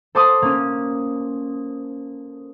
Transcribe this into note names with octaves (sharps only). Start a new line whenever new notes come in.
A4 C5 A5 C6 D6 D#6
A#3 C#4